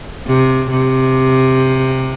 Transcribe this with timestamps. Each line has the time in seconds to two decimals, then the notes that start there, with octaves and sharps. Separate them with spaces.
0.26 C3
0.70 C3